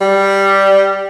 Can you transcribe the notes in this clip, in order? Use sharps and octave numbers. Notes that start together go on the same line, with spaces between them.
G3